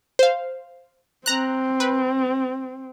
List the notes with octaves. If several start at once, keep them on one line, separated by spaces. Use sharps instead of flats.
C5 F5
C4 A#5 F#6
B4